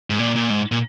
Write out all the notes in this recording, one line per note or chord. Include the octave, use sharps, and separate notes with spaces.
G#2
A#2
A#2
G#2
A#2